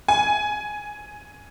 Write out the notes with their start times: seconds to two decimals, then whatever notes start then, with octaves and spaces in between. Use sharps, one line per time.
0.08 G#5